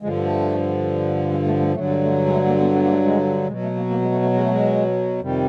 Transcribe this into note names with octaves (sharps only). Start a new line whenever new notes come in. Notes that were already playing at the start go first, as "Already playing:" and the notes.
G2 D3 F3 G#3
A3
G#3
A3
A3
G2 D3 F#3 A3
A3
A3
G#3
A3
A#3
B3
B3
A#3
A3
G#3
B2 F#3 G#3
A3
A#3
A#3
G#3
A3
A3
G#3
A3
G#3
F2 C3 D#3 G3